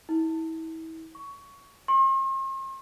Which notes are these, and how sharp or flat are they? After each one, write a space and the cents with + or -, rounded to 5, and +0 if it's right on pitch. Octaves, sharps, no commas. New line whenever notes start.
E4 -35
C#6 +15
C6 +45